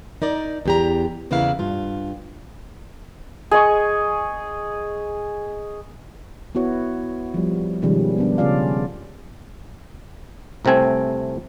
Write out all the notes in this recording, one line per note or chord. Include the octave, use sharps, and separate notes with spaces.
D#4 A#4 D5
E2 G4 A#5
E2 C#3 A#3 E4 B4 F5
G2 F4
G#4 D#5 C#6
B3 E4 F#4 C#5
F3 G3
B2 D#3 F3 G3 G#3 C#4
B3 D4
C#3 C#4 F4 D5 F5
C2 C3 A3 C4 G#5